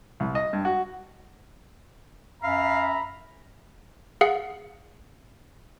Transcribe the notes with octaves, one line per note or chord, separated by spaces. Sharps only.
C2
D#5
G2
F#4
F#2 E5 F5 A#5 B5
G#4 F5 F#5